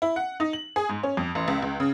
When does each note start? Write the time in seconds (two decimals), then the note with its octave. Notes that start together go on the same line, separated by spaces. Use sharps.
0.02 E4
0.16 F#5
0.40 D#4
0.53 F#7
0.76 G#4
0.89 G#2
1.03 C#4
1.17 F2
1.35 A1
1.48 C#2
1.62 C#2
1.80 C#3